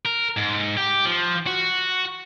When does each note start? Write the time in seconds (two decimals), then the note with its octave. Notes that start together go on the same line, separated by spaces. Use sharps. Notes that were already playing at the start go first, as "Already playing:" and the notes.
0.06 A#4
0.37 G#2
0.77 G4
1.05 F3
1.47 F#4